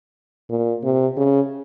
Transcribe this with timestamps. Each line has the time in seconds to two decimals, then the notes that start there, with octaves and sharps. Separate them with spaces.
0.50 A#2
0.84 C3
1.17 C#3